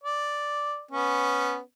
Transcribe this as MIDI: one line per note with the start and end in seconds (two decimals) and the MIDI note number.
0.04 0.83 74
0.91 1.59 59
0.91 1.59 61